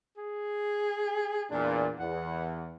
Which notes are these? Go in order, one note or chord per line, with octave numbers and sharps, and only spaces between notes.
G#4
E2 A#2 D4
E2 F#5